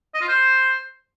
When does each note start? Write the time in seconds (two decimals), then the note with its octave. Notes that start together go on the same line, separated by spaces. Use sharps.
0.14 D#5
0.21 F4
0.28 C5